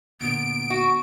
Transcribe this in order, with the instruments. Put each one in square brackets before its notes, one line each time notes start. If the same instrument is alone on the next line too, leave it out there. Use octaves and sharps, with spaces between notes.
[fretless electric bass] D2 A#2 D3 [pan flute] B3 [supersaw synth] D7
[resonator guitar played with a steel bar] F#4